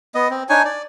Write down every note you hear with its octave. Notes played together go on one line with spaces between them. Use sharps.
B3 D#5
C4
D4 D#4 C#5 G#5
D5